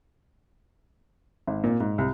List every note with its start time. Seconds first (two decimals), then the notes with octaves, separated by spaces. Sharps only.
1.47 G#1
1.64 A#2
1.80 G#2
1.98 C2